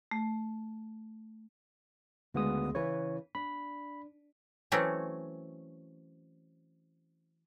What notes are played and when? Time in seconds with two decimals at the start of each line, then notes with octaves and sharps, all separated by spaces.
0.11 A3
2.34 D2 C#3 G#3 B3 D#6
2.75 C#3 E3 B4 C#5
3.35 D4 B5
4.72 E3 F#3 A3 C4 C#4